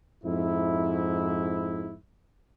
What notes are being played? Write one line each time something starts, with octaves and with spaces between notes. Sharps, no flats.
F2 G#2 E4